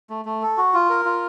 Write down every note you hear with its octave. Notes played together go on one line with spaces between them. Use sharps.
A3
A3
A4
F#4
F4
A#4
F4